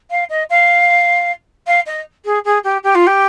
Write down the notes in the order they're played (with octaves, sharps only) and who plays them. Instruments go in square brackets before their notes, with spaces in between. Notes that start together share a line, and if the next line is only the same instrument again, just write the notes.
[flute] F5
D#5
F5
F5
D#5
G#4
G#4
G4
G4
F4
G4